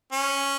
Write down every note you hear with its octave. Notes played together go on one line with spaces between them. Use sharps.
C#4